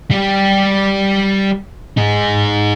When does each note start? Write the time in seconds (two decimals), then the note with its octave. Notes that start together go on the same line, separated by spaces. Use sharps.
0.11 G3 G4
1.97 D#4 G#4